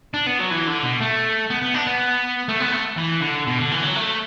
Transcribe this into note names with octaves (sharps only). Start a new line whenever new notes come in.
D4
B3
F#3
E3
D3
B2
A3
B3
B3
D4
B3
A3
B3
A3
E3
D3
B2
D3
E3
F#3
A3